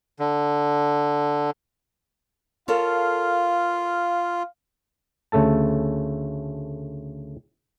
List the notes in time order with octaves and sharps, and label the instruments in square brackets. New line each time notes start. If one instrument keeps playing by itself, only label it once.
[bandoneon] D3
[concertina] F4 [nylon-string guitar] A4 A#4 C#5 [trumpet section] F5
[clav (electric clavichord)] D2 C#3 A3 A4 A5